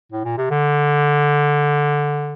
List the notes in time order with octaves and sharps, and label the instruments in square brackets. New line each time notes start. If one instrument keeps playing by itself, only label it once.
[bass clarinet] A2
A#2
C3
D3